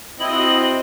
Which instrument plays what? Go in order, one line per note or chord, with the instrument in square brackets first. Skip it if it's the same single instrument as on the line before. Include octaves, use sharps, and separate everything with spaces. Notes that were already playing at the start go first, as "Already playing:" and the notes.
[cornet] C4 [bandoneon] E4 [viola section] F#4 D#5 [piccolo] F#7